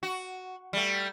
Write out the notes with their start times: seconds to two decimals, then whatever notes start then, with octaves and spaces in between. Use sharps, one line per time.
0.03 F#4
0.73 G3 A3